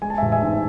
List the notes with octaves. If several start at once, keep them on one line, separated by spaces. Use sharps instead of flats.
G#3 G#5
A5
A1 E5 G#5
E5 G#5
G#2